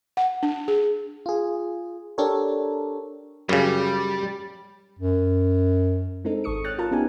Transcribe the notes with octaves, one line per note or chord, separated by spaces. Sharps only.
F#5
D4
G#4
F4 G#4
D4 G4 A4 A#4 C#5
F#2 C#3 G3
F#2
G#3 C4 D4 D#4 A4
G#1 A4 C#6 D#6 C#7
C#5 G5 F6 F#6 A6
F4 A#4 A5
B3 C#4 D#4 G4 G5 G#5